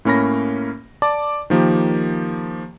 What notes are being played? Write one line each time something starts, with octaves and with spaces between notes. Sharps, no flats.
A2 A#3 C#4 A#4 B5 A#6
D5 A5 D6
D#3 F3 A#3 G4